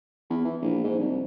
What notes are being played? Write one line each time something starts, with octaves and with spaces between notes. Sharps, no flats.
E2
E3
A#1
G#2
C2